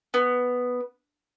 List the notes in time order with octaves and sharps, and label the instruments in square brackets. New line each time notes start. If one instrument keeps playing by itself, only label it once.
[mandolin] B3